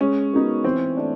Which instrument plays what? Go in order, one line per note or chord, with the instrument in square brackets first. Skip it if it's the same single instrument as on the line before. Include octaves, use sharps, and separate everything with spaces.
[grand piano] G#3 [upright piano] C#4
[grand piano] B3 D#4 F#4 A#4
[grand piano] E3 [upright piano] C4
[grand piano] A3 D4